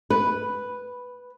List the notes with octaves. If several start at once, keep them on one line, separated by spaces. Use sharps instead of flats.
B4